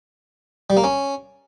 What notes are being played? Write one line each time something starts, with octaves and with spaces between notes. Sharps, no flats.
G3
A#3
C#4